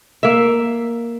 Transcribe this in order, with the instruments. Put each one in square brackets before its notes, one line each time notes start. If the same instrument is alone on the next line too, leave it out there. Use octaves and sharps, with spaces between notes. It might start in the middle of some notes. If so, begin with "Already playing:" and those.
[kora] A#3 E5